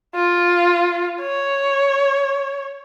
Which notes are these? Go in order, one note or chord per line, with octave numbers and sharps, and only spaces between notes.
F4
C#5